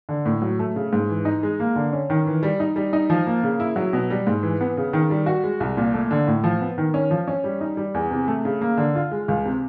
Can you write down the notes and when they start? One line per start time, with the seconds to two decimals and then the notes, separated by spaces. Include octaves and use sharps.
0.09 D3
0.26 A2
0.42 F#3
0.59 A3
0.76 C#3
0.93 G#2
1.09 E3
1.25 D#4
1.43 G#3
1.60 A#3
1.76 D3
1.93 C#4
2.10 D#3
2.26 E3
2.43 G3
2.60 D#4
2.76 G3
2.93 D#4
3.10 F3
3.27 A#3
3.43 C#3
3.60 E4
3.76 F#3
3.93 B2
4.10 G3
4.27 G#2
4.43 E3
4.61 B3
4.77 C#3
4.93 D#3
5.10 G3
5.26 F#4
5.43 G#3
5.60 C2
5.77 A#2
5.94 A3
6.11 D3
6.27 A2
6.44 F3
6.61 B3
6.78 D#3
6.94 C#4
7.11 F3
7.28 C#4
7.44 G3
7.61 D#4
7.77 G3
7.94 E2
8.11 C3
8.28 A3
8.45 C#3
8.61 A#3
8.77 D3
8.95 F4
9.11 G#3
9.28 C#2
9.45 C3